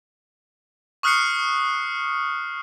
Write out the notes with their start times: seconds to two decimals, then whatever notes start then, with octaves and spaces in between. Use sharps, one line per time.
1.03 C#6 D#6 F6 F#6 C7 C#7